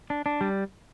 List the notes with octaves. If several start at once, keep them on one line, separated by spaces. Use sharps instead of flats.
D4
D4
G3